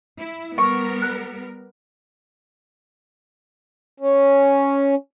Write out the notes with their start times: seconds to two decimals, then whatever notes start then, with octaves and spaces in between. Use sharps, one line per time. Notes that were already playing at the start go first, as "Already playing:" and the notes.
0.18 E4
0.58 G3 B3 A#4 C#6
1.02 F#6
4.00 C#4